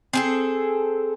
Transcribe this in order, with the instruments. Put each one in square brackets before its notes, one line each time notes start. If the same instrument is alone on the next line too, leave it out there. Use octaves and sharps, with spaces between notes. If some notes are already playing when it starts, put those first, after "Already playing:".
[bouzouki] C4 G#4 A4